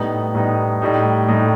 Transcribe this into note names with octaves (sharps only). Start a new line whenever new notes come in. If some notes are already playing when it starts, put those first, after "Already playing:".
Already playing: A2 G3 B3 D#4
A2 G3 B3 D#4
A2 G3 D#4
A2 G3 D#4